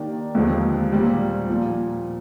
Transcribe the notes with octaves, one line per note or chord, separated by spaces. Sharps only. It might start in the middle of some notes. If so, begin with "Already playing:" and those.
Already playing: D#3 A#3 D4 G4
D#2 D3 F3 G#3 C4
A#2 G3 C4
A#2 F3